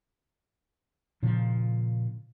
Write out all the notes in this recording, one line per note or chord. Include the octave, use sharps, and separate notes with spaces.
A#2 C#3 F3